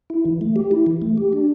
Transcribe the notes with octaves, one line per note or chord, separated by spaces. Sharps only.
E4
E3
A3
G4
E4
E3
A3
G4
D4